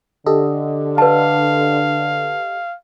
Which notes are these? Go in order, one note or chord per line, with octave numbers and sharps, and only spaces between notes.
D3 G4 A4 D#5
B4 F5 A5